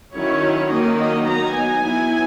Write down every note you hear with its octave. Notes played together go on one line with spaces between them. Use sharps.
D#3 F#3 C#4 E4 C#5
D#3 F#3 A#3 D#4 D#5
D#5
F#3 B3 D#4 A#5
G#5
F#3 B3 E4